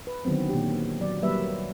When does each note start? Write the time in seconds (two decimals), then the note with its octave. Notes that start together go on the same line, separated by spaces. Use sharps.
0.07 B4
0.25 D3 D#3 F#3 B3 C4
0.49 A#2 D#3 G4
1.00 F#3 D5
1.22 F#3 G3 A#3 B4 E5